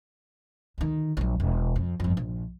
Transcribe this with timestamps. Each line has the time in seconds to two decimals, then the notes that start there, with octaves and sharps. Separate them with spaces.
0.78 D2 D#3
1.17 A#1 F#3
1.40 E1
1.76 F2
2.00 G1 F2
2.17 A#1